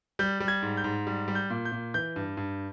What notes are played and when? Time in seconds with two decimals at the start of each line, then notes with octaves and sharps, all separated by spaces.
0.19 G3 G6
0.40 G3
0.48 G#6
0.62 G#2
0.77 G6
0.84 G#2
1.07 G3
1.28 G3
1.35 G6
1.50 A#2
1.65 G6
1.72 A#2
1.94 E3 G6
2.16 G2
2.37 G2